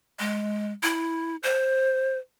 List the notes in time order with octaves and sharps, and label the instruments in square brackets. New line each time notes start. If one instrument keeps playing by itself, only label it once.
[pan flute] G#3
E4
C5